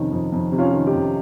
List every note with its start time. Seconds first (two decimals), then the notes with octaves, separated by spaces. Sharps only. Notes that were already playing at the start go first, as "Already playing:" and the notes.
Already playing: F2 C3 D#3 C#4
0.12 F2
0.32 F2
0.52 C3
0.58 C#4 F4
0.73 D#3
0.86 D#4 G4
0.92 F2